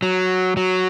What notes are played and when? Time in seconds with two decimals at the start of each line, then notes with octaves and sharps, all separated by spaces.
0.02 F#3
0.57 F#3